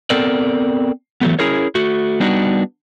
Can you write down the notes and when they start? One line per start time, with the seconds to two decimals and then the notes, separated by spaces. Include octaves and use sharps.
0.10 B3 C4 A4 A#4 D5
1.21 E3 F#3 A3 B3
1.39 C#4 E4 G#4 A#4 C#5
1.75 A3 F#4
2.20 G3 B3 D4 D#4 F#4